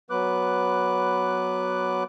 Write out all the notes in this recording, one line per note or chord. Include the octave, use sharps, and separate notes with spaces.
F#3 B3 B4 D6 F#6